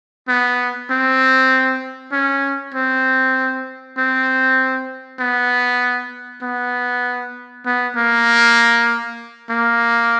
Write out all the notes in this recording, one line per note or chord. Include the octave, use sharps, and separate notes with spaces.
B3
C4
C#4
C4
C4
B3
B3
B3
A#3
A#3